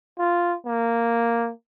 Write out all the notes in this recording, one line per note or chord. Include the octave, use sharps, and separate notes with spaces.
F4
A#3